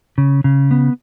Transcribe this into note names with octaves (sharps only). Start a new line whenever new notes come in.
C#3
C#3
B3